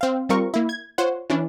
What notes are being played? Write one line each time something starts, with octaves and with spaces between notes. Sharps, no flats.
C4 F5
G3 C4 F4 A#4 C#6
A#3 E4
G#6
F4 C5 C#5 F#5
E3 C#4 D4 E4